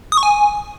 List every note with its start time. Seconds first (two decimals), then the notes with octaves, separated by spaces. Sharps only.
0.12 D#6
0.17 C#6
0.23 G#5